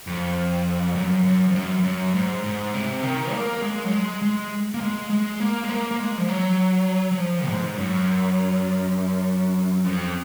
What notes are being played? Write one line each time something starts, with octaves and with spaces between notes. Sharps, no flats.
F2
F#2
F#2
F2
F#2
F#2
G#2
G#2
C3
D#3
A#3
G#3
F#3
G#3
G#3
A#3
G#3
G#3
A#3
G#3
A#3
A#3
G#3
F3
F#3
F#3
F3
G#2
F#2
F2